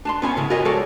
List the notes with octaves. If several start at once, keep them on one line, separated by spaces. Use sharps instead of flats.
D4 A5 C6
B3 C#4 G#5
A2 C#3
F4 F#4 A#4 C#5 D#5 G#5
G#3 A4 A#4 C#5 D5